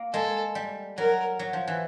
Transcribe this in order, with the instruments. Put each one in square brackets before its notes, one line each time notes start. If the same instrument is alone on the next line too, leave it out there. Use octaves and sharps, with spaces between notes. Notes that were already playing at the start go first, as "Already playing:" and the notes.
Already playing: [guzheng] A#3
[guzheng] G#3 [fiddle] A4
[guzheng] G3
[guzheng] F#3 [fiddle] A#4
[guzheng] F#3
F3
E3